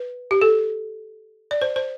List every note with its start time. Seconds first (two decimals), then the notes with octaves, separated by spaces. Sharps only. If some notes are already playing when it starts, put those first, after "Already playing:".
Already playing: B4
0.31 G4
0.41 A4
1.51 D5
1.62 C5
1.76 C5